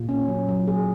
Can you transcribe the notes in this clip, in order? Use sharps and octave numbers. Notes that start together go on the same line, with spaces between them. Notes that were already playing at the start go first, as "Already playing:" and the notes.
Already playing: A#2
C#4
F#3
F#3
G#4